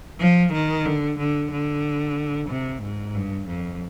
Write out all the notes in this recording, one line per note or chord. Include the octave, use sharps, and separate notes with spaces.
F3
D#3
D3
D3
D3
C3
G#2
G2
F2